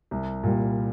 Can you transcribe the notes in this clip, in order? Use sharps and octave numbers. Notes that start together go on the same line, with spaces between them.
C2
A#2 G3